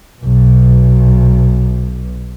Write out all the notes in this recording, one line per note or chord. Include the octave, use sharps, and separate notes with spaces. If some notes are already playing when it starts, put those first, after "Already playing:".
B1 B2